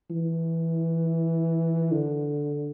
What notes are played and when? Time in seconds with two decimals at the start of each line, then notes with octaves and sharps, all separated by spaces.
0.11 E3
1.92 D3